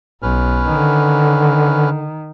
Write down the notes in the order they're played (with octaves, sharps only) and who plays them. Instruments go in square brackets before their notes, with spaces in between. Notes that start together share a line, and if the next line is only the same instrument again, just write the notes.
[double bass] B1 [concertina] C#4 B4 F6
[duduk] D3 [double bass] D#3